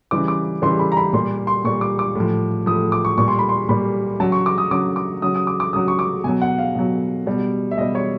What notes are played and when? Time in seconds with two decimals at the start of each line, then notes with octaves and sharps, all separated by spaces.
0.11 C#3 E3 G3 D6
0.28 D6
0.62 C#3 E3 G3 C6
0.79 B5
0.92 A#5
0.97 B5
1.13 A#2 G3 C6
1.47 C6
1.64 A#2 G3 C#6
1.81 D6
1.99 D6
2.15 A2 F3
2.66 A2 F3 D#6
2.92 D6
3.05 C#6
3.18 A#2 G3 C#6
3.28 C6
3.39 B5
3.49 C6
3.69 A#2 G3 B5
4.20 C#3 F#3 A5
4.32 C#6
4.46 D6
4.58 D#6
4.71 C#3 F#3 D6
4.96 D6
5.22 C#3 F#3 D#6
5.36 D#6
5.47 D6
5.60 D6
5.73 C#3 F#3 D#6
5.88 C#6
5.99 D6
6.24 B2 F#3 G#5
6.42 F#5
6.58 F5
6.75 B2 F#3
7.26 B2 G3
7.71 E5
7.78 B2 G3 D#5
7.95 C#5